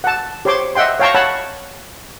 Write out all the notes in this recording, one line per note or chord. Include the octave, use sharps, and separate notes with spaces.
F#5 A5
G4 C5 C#5 C6 D6
D#5 E5 F#5 G5 C6
C#5 F5 G5 A5 A#5 C#6
C#5 F#5 A5 B5